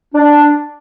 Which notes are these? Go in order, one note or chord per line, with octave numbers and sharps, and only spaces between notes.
D4